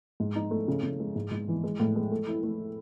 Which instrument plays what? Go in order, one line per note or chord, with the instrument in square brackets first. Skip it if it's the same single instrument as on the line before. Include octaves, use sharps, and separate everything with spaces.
[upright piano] G#2
D#4
A3
C#3
C#3
G#3
G#2
G#2
E3
G#3
A2
G#3
A3
E4
A3